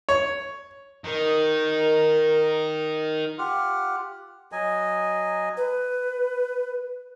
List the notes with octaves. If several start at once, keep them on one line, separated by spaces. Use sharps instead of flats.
C#5
D#3 A#4
F4 G4 F#5 F6
F#3 D#5 G#5
B4